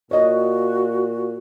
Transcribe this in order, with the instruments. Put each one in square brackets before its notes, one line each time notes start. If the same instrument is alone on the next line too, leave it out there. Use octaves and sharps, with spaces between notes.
[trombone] A#2 [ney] F#4 [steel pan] C#5 D#5